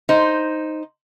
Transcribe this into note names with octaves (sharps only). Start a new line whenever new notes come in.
D#4 C5